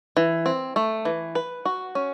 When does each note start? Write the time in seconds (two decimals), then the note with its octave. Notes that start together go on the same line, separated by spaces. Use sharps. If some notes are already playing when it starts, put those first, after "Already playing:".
0.17 E3
0.46 C4
0.76 A3
1.05 E3
1.35 B4
1.65 F#4
1.95 C#4